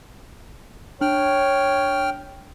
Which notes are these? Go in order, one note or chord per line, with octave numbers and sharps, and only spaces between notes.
D4 C#5 G5 F6